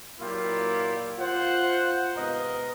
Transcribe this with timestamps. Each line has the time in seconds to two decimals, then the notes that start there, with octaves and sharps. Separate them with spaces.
0.20 A#2 F#3 A#3 E4 F4 G4
1.18 F4 C5 F#5
2.15 G#2 C3 B3 A#4 D#5